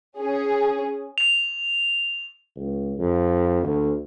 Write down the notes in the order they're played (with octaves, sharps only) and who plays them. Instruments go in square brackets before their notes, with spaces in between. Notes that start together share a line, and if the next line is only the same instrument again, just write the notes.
[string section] C#4 G#4
[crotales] F7
[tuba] C#2
F2
D2